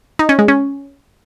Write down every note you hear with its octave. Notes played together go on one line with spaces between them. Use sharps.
D#4
C#4
G#3
C#4